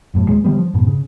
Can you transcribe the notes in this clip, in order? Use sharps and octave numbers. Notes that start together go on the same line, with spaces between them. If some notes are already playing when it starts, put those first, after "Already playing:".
F#1 F#2 A2
D#2 G#3
D3 E3 G3 B3
F3
F1 G#2 B2
C#3